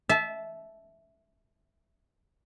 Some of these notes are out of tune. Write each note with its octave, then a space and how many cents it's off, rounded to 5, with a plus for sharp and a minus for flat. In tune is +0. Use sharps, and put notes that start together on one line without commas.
E5 +0 A5 -25